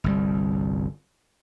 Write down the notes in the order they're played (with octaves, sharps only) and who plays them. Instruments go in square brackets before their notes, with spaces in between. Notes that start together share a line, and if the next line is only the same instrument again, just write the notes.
[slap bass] G1 C2 G3